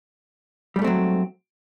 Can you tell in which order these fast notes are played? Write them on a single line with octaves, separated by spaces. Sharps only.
G3 G#2 A3 C4 F#3